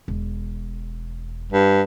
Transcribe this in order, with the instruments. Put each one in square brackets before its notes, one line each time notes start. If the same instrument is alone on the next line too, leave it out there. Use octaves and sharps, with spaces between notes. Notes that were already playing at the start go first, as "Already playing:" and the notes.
[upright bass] E1
[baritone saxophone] G2